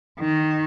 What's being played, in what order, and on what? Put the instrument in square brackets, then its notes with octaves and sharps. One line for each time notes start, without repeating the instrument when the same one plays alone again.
[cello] D#3